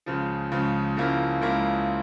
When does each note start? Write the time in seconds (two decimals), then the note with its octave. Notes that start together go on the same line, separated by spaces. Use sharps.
0.06 C#2 C#3 F3
0.52 C#2 C#3 F3
0.97 C#2 C#3 F3 A#3 E4
1.41 C#2 C#3 F3 A#3 E4